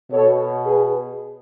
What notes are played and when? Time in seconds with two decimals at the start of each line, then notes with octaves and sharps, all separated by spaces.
0.11 B2 A4 C#5
0.65 G#4 B4